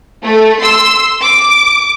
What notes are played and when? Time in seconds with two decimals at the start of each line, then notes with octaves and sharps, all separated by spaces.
0.23 A3
0.61 C6 E6
1.21 D6